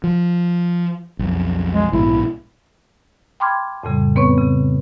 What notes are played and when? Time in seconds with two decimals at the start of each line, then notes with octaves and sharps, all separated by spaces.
0.04 F3
1.19 B1 F2
1.73 G#3
1.93 A#1 G#2 B2 E4
3.40 G5 B5 C6 D6 F6 G#6
3.83 F2 A2 C#3 G3
4.16 E2 B3 C4 B4 C#5 C#6
4.38 C#3